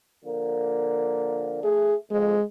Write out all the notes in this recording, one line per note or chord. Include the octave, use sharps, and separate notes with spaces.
D3 F3 A#3
A3 G#4
F2 G#3